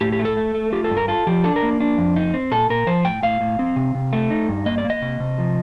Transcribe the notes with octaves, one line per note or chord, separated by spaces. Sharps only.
A2 G4
G4
A3
A4
A3
A3
F4 G4
A4
G2
A#4
F4 A4
F3 G4
D4 A4
A#4
A#3
D4
F2
D#4
C4
A#2 A4
A#2 A#4
F3 C5
A2 G5
A2 F5
A2
C4
C3
C3
A3
D#4
G2
A#3 D#5
D5
A#3
D#5
C3
C3
F3